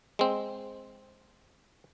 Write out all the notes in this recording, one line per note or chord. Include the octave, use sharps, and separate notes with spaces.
G#3 C4